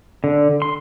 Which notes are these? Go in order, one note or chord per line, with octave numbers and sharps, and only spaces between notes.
D3
C6